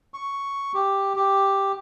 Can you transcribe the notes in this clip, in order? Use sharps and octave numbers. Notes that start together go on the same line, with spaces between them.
C#6
G4
G4